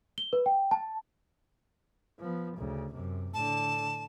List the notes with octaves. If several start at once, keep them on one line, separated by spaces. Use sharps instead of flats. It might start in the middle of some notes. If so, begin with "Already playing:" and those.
G7
B4
G5
A5
F3 B3
D2 C#3
F#2 C3
A2 D3 A5